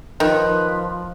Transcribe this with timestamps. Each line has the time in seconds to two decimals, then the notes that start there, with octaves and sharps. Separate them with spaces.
0.20 D#3 F3 B4